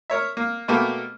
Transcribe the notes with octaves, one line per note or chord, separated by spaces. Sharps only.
A#4 C#5 E5
A#3
B2 A3 A#3 G4 A4